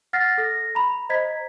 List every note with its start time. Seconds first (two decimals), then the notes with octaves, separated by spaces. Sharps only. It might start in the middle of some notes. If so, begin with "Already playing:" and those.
0.13 F#5 F6 A6 A#6 C7
0.38 A4 A#6
0.75 A#5 B5
1.09 C5 D#5 A#5 G#6 B6